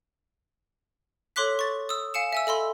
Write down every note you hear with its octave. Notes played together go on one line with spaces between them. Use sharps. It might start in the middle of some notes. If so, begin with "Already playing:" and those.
A4 C#5 C6 D6 F#6 B6
C#6 A6
D#6 E6
F5 G#5 C#7 E7
E5 G#5 E6
A4 D#5 B5 C6